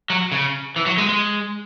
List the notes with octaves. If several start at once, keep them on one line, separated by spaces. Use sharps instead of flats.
F#3
C#3
E3
F#3
G#3
G#3